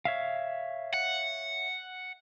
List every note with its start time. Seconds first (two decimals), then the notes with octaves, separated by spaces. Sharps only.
0.05 C#5 E5 F5
0.94 F#5